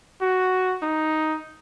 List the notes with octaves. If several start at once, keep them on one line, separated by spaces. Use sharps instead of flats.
F#4
D#4